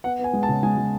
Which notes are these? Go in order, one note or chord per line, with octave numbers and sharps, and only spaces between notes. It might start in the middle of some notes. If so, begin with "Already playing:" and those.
B3 F#5
B3 G#5
G#3
A5
C#3
G#3 G#5
G#3